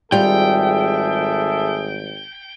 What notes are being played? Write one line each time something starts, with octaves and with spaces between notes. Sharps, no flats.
G#1 G3 F4 G#4 A4 E5 G5